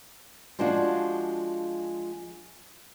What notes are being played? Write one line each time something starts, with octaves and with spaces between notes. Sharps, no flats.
F3 G#3 D4 F4 F#4